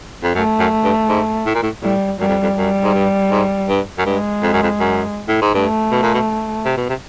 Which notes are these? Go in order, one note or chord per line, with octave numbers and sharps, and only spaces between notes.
F2
F#2 A3
F#2
G2
G#2
A2
A#2
A2
A2 G3
F#2 G3
F2
F2
F#2 G3
G#2
G2
G#2
G2
F#2
G2 G#3
F2
F#2
F2
F#2
A2
G#2
G2 A3
B2
A#2
B2
C3
B2
C3